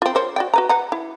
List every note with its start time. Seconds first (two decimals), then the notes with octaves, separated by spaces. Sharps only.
0.02 C4 F4
0.15 A#4 C5 C#5
0.36 F#4 D5 G5
0.54 F#4 B4 A#5
0.69 B4 F#5 A#5
0.92 E4